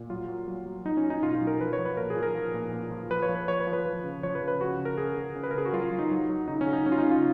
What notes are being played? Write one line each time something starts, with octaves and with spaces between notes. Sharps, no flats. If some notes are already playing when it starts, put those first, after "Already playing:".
Already playing: A#2
F#3 F4
F#3
F#3
F#3
F#3 D#4
C#4
F#3
D#4
B2 F4
F4
F#3
A#4
F3 B4
C#5
F3
B4
A#2 A#4
G#4
F3
A#4
F3
A#2
A#2
F3
F3 B4
C#5
F3
B4
F3 C#5
B4
F3
B4
F3
C#3
F3 C#5
B4
C#3
B4
C#3 F#4
C#3
A#4
C#3 G#4
C#3
C#3
B4
A#4
C#3 G#4
F#4
F#3 F4
F#3
D#4
F#3
F#3
C#3 D#4
C#4
C#3
D#4
F#3 C#4
F4
D#4
C#3
F4